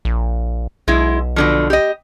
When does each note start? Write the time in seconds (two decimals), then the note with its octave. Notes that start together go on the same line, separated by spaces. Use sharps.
0.05 A#1
0.88 B1 G#3 E4
1.36 B2 D3 F3
1.70 G4 D#5